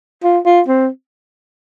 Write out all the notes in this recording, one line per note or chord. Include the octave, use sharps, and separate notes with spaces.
F4
F4
C4